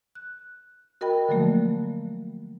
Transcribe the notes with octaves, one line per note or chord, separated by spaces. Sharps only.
F#6
F#4 A#4 D#5 G5 B5
D3 F3 F#3 A3 A#3